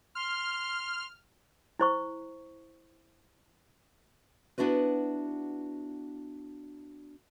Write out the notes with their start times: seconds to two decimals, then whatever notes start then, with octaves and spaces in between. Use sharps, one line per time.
0.15 C6 F6
1.79 E4 C5 C#6
4.58 B3 D4 E4 F#4 B4